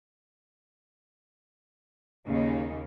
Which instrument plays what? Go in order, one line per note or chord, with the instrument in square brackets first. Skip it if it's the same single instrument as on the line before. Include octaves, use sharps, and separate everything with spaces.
[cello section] D#2 C#3 A#3 D#4